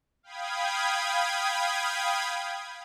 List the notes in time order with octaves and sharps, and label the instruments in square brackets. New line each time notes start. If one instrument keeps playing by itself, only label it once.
[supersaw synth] F5 G5 B5 D#6 G#6